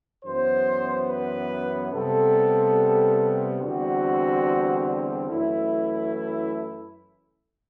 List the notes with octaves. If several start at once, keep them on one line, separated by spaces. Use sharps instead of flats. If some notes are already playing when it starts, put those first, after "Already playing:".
F#2 E3 B3 C5
B4
C3 G3 B3 A4
E2 D3 G3 C4 F#4
F#2 E3 A3 E4